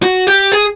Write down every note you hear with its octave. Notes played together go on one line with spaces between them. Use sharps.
F#4
G4
G#4